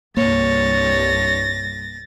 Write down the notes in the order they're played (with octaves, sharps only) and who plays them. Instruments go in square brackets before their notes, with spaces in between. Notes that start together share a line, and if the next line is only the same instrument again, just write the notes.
[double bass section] C2 G2 [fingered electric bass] A#3 [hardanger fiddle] C#5 [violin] A6 A#6